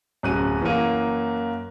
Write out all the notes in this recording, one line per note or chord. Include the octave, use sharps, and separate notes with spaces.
D1 F#2 F#6 D#7
F#2 E3 A#3 D#7